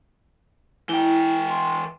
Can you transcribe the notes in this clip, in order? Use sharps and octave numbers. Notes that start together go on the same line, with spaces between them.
E3 E4 G5
C6